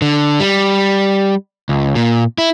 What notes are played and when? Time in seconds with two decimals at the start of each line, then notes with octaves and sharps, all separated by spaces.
0.02 D3
0.40 G3
1.69 C#2
1.95 A#2
2.38 E4